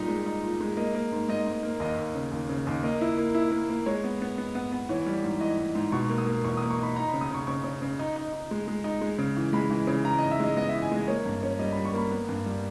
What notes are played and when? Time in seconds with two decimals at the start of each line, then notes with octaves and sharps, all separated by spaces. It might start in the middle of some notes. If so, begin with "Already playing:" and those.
Already playing: A#2 G3 D#4 D#5
0.08 G#3
0.26 D#4
0.43 A#2
0.60 G#3
0.77 A#3 D#5
0.95 A#3
1.12 G#2
1.29 G#2 D#5
1.47 G#2
1.63 A#3
1.80 D#2 D#5
1.97 D#2
2.15 C#3
2.32 D#2
2.49 C#3
2.67 D#2
2.83 A#3 D#5
3.01 E4
3.17 A#3
3.35 E4
3.52 A#3
3.70 A#3
3.86 G#3 C#5
4.04 B3
4.22 B3
4.38 B3
4.55 B3
4.72 B3
4.89 E3 C#5
5.06 G3
5.23 G#2
5.41 E3 D#5
5.58 G#2
5.75 G#2
5.92 B2 C#6
6.09 A#3
6.18 D#6
6.27 A#3
6.44 E2 C#6
6.57 A#3 D#6
6.71 C#6
6.79 D#4 B5
6.96 D#4 A#5
7.08 B5
7.14 C#3
7.21 D#6
7.31 C#3 C#6
7.47 C#3 C#6
7.64 C#3
7.82 C#3
7.99 D#4
8.16 D#4
8.33 D#4
8.51 G#3
8.68 G#3
8.84 D#4
9.01 G#3
9.19 C#3
9.37 E3
9.53 G#3 B5
9.71 E3
9.87 C#3
10.04 E3 A#5
10.18 G#2 D#5
10.31 E5
10.40 G#3 D#5
10.56 B3 D#5
10.69 E5
10.74 E3
10.82 G#5
10.92 G#3 D#5
11.08 A#3 C#5
11.26 G2
11.43 C#4
11.59 G3 D#5
11.72 G3 B5
11.85 C#6
11.93 A#3 B5
12.11 B3
12.29 G2
12.46 G3